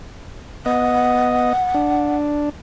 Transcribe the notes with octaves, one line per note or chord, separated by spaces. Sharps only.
B3 D#5 F#5
D4